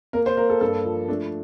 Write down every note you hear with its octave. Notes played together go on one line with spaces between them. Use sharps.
A#3 A#4
C5
A#3 A#4
A4
G2 A4
F3
A3 D4